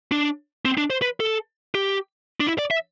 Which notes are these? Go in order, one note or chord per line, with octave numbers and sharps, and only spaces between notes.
D4
C4
D4
C5
B4
A4
G4
D4
E4
D5
E5